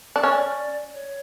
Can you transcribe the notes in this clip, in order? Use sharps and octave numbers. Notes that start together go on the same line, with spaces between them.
D4
C#4 D5
C#5